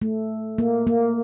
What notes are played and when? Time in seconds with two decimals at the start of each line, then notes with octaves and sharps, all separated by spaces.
0.02 A3
0.58 A#3
0.87 A#3